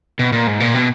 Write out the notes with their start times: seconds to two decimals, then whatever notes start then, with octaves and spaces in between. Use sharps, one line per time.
0.19 B2
0.32 A#2
0.47 G#2
0.60 A#2
0.74 B2